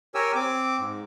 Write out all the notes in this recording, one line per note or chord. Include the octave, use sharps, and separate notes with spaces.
G4 A#4 C#5 G#5 E6
C4 D6
G#2